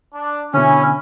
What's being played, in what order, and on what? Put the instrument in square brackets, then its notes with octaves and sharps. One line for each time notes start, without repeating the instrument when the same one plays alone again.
[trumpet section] D4
[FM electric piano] B2 D3 [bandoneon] C#4 [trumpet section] E4 G#5